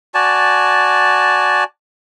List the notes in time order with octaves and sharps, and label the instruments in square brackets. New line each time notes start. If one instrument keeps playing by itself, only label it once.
[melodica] F#4 D5 G#5 A5